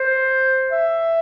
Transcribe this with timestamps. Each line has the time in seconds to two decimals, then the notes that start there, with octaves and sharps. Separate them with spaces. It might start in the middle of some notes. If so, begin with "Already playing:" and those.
Already playing: C5
0.71 E5